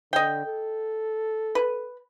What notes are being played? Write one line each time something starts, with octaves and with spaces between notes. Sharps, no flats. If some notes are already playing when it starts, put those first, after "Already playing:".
D3 D#5 G5
A4
B4